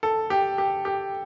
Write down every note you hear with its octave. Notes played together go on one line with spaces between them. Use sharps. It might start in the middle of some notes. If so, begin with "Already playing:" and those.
A4
G4
G4
G4